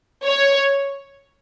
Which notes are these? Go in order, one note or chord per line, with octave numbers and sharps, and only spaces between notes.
C#5